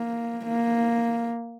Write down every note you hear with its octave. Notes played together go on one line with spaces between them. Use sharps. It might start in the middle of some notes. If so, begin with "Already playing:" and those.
Already playing: A#3
A#3